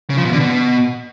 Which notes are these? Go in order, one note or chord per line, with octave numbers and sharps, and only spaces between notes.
C#3
F3
B2
D3
B2